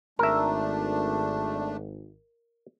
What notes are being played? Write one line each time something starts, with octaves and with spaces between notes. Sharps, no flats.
G#1 A3 D4 A#4 E5